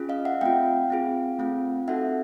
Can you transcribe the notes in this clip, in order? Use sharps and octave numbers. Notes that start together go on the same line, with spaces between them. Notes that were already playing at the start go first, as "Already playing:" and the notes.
Already playing: C#4 F4 G#4
D#5 F5
E5 F#5
A3 C4 F4 F5 G5
C4 F4 G#4
A3 C4 F4
C4 D#4 F#4 A4 E5 F#5